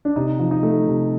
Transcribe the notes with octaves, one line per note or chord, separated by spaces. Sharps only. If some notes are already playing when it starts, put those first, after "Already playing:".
D4
C3 D#4
F3
D#4
A3
C3